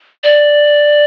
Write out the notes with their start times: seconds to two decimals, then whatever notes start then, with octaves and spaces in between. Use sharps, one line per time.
0.24 D5